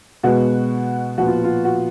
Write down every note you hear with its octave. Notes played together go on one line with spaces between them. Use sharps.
B2 G#3 B3 F#4
A#2 F3 B3 F#4
F4
F4
F#4